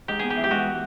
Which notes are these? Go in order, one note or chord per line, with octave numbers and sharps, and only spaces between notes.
G#2 G4
B3 G#4
G4
E3
G4
G#3 F#4